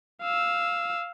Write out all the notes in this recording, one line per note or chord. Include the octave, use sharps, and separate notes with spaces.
F5 E6